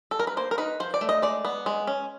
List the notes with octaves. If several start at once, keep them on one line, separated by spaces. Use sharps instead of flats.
A4
A#4
B4
A#3 C5
A#4
D#4 B4
F3 C5
D5
A3
D#5
G#3 D5
B3
G#3
C#4